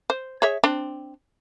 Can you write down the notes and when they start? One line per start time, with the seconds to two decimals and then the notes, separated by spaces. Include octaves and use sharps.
0.10 C5
0.42 G#4 C#5 E5
0.64 C4 D4